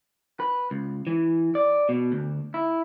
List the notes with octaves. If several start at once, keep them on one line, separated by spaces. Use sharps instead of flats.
B4
C#2
E3
D5
B2
D2
E4